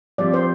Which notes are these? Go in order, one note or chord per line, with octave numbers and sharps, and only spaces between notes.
F3 C4 G4 D5
C5